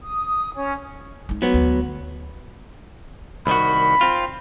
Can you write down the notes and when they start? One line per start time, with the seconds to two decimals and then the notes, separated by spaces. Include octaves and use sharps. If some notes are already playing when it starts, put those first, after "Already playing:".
0.03 D#6
0.55 C#4
1.29 G#3 D#4
1.42 F#3 B3
1.54 D2 G3
3.47 C2 D#3 F#4 B5
4.01 C4 F4